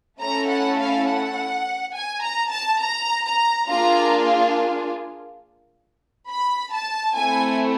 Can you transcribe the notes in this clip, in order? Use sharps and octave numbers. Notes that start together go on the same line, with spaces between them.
A3 C#4 E4 A4 A#5
F#5
F5
F#5
G#5
A#5
A5
A#5
A#5
A#3 D4 F4 G#4 A#5
B5
A5
A3 C4 E4 G#5